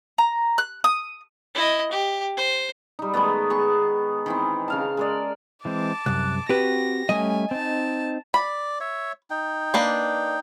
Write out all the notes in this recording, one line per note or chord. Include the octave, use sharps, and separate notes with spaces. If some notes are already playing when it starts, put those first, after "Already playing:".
A#5
F#6
D#6
E4 D#5
G4
C5
G3 D#4
D#3 G#3 A3 B3
B3 G#4 C#6
D#3 E3 C4
C#3 F5 A5
G#3 A#4 D5
E3 G#3 C4 A5 D6
C2 F#2 F#6
C4 F#4 G4 B4 A#6
G3 A3 C#4 D#5 G#5
C4 D#4 A5
D5 B5
C#5 E5
D#4 G5
A#3 D4 B4